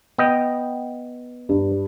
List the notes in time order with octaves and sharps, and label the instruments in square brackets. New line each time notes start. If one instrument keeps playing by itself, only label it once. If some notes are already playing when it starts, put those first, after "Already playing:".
[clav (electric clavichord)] B3 D#5 G5
[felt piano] G2